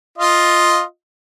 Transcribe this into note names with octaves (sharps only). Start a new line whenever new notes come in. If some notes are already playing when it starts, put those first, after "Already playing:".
F4 D#5 F5